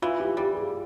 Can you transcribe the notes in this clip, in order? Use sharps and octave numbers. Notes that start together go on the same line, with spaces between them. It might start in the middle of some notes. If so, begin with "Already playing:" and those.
E3 F4
G4
G3 G4
G#4